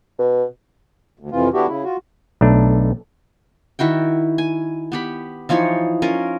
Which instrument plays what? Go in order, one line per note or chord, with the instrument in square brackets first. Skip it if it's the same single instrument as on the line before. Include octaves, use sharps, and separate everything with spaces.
[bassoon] B2
[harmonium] D2
F2 C3 E3 F4
D3 B3 D4 E4 F#4 G4
C#3 E4
F4 F#4
[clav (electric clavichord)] B1 A3 D4
[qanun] D#3 E4 F#4 G5
G#5
B3 G4 B5
E3 F3 D#4 C#5
C#4 F4 A#4